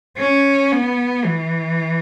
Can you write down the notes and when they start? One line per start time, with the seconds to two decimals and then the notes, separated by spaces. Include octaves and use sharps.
0.19 C#4
0.72 B3
1.25 E3